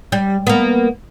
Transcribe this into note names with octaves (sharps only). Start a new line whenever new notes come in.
G3
A#3 B3